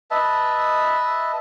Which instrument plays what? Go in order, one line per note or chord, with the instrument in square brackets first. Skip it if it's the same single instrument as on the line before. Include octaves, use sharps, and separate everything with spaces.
[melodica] B4 D#5 E5 A5